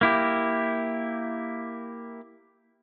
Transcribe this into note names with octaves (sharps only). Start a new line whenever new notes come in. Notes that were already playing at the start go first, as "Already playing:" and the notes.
A#3 E4 G4